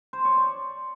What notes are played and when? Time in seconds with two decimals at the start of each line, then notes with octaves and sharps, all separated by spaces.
0.13 C5
0.25 C#5
0.36 D5